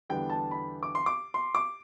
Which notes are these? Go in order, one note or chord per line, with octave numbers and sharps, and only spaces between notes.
E2 D3 G3 B3 D4 G5
A5
B5
D6
C6
D6
C6
D6